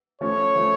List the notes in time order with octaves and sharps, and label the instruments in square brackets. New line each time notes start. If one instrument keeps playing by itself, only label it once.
[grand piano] F3 A3 C#4 [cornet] C#5
[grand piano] F3 A3 C#4